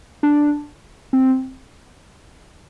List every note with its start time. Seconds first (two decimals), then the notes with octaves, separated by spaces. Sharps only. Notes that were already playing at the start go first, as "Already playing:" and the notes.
0.23 D4
1.13 C4